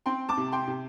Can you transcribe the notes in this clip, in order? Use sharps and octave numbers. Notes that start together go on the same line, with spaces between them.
C4 G5 C6
A5 D6
C3
G5 C6
C3